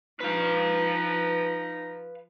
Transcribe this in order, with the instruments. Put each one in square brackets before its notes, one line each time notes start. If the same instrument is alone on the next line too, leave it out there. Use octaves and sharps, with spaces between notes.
[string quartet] F3 [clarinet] D#4 [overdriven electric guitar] B4 F5